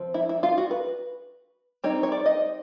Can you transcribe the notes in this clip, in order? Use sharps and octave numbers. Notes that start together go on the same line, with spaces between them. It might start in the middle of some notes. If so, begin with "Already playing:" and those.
Already playing: F3 C4
E4
E4
F4
F#4
B4
G3 C4 D#4 C#5
C#5
D5
D#5